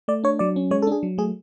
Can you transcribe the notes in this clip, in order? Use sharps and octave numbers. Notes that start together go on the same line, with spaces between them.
A3 D5
D4 C#5
F#3 D5
C#4
G#3 C#5
A4
D4 G#4
F#3
A3 G#4